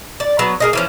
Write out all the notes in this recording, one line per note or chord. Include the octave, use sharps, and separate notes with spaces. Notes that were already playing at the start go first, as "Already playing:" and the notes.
D5
F#3 B3
A#3 G#4 D#5
E3 F3 C#4